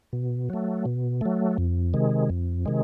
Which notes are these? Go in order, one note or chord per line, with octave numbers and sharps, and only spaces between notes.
B2
F#3 A3
B2
F#3 A3
F2
C3 D#3 G#3
F2
C3 D#3 G#3